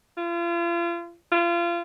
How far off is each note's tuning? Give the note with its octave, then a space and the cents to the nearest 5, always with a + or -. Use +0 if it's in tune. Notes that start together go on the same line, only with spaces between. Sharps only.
F4 -35
F4 -30